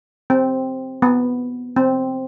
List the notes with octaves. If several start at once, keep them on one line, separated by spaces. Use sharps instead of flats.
C4
B3
C4